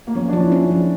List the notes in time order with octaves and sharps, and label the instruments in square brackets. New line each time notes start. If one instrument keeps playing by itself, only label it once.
[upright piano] A#3
[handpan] F3 [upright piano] C#4
[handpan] F3 [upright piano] D4
[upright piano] E4
[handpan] C#4
F3